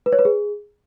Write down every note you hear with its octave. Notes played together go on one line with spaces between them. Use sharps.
B4
C#5
B4
G#4